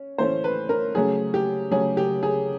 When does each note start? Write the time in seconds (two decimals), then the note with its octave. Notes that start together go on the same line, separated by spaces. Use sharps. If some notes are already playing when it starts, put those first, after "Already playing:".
Already playing: C#4
0.18 A2 E3 A3 C#4 C5
0.44 B4
0.69 A#4
0.95 C#3 F#3 A3 C#4 G#4
1.34 G4
1.71 C#3 F#3 A3 C#4 G#4
1.97 G4
2.23 G#4